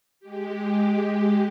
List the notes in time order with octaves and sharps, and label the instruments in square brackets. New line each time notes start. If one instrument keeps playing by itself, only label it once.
[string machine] G#3 G4